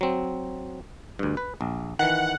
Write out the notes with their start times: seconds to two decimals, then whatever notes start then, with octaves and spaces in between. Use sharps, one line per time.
0.01 F#3 C4
1.19 D2 G2
1.37 B4
1.61 A#1
1.99 D#3 E3 F#5